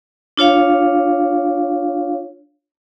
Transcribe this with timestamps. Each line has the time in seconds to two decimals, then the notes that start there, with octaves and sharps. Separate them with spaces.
0.37 D4 F4 C#5 F5